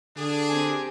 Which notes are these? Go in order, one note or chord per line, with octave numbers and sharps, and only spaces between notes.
D3 D4 G#4
C4 G4 G#5